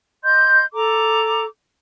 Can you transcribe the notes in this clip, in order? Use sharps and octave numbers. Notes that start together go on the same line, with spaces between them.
D#5 C6 G6
A4 A#5 D6